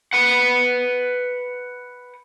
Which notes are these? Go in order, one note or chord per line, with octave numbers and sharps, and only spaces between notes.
B4 F#5